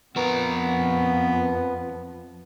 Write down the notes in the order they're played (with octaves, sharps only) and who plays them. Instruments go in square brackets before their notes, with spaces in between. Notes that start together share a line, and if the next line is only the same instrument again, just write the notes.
[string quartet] F2 [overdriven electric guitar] F3 A#4 [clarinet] B3 [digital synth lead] B4